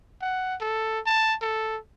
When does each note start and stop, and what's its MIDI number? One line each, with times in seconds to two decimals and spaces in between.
0.21 0.55 78
0.61 0.99 69
1.06 1.35 81
1.41 1.78 69